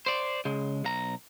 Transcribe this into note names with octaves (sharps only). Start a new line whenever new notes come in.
C5 D5
C#3 G#3
B1 A#5